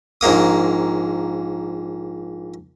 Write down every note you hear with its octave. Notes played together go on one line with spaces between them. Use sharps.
A#1 G#2 A#3 D#6